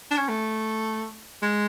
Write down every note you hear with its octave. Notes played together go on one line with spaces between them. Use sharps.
D4
C#4
A3
G#3